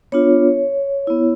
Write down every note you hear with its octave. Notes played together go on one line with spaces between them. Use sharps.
B3 D4 F4 C#5
B3 E4